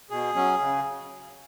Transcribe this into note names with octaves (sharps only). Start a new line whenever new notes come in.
B2 G#4
F#3 C#4
C#3